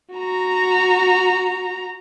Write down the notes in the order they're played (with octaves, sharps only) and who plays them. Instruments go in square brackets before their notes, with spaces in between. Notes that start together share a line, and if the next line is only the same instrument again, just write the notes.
[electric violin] F#4 A#5